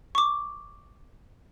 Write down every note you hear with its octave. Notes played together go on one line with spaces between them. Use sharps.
C#6 D6